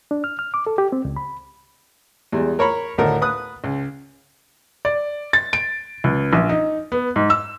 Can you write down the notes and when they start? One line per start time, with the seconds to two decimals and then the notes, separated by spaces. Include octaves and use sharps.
0.11 D4
0.24 F6
0.39 F6
0.54 D6
0.67 A4
0.78 G4
0.92 C4
1.05 C#2
1.17 B5
2.32 E2 G3 G#3
2.59 A#4 C#5 A#5 B5
2.98 D2 A2 D3 D#3 D#4 A#4
3.22 B4 D#6 F#6
3.64 C#2
4.85 D5
5.33 A6
5.53 D7
6.04 C#2
6.33 A#1
6.49 D#4
6.92 B3
7.16 G#2
7.30 E6